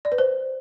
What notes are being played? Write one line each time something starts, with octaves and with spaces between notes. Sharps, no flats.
D5
B4
C5